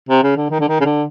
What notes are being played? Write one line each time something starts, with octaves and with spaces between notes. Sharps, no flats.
C3
C#3
D3
D#3
D3
D#3
C#3
D3